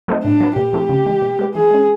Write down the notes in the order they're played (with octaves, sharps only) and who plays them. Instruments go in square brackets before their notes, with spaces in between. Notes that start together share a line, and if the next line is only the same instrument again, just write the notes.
[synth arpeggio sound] F#3 A3 C4 D#4
[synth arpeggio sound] A2 [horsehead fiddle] D4
[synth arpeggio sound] F#3 B3
[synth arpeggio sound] A#2 [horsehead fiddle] G4
[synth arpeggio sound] F3 A3 C4 E4
C#3
E3 G#3
B2
G#3 B3
[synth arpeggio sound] E3 [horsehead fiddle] G#4
[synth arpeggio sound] G#3 C#4